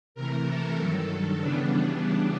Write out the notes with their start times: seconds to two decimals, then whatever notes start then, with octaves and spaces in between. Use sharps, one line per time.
0.15 C3 E3 A3 A#4
0.46 A4
0.77 G2 D#3 F#3
1.39 C#3 E3 G3 B3 D4